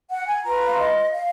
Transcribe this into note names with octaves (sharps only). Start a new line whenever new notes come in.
F#5
G#5
F4 B4 A#5
F5
D#5
F5